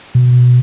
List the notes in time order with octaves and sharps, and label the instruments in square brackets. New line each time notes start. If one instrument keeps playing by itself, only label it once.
[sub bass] B2